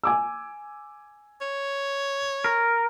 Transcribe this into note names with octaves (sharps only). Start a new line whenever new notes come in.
G#5 D6 E6
C#5
A#4